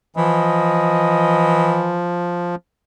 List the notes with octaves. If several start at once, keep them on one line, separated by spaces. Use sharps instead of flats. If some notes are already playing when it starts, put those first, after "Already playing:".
E3 F3 D#5